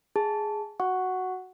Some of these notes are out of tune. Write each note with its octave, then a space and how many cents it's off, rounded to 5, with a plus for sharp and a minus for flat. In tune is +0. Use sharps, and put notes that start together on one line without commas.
G#4 +0 A5 +0
F#4 +0 F#5 +0 C#6 +0